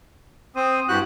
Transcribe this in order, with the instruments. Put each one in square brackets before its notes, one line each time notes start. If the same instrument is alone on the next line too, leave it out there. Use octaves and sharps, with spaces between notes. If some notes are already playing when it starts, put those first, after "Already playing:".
[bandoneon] C4 C5 [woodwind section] D#6
[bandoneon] G2 F#4 F#6 [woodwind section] E4 G4